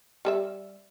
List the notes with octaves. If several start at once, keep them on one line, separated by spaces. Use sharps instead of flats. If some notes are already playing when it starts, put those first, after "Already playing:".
G3 A4 E5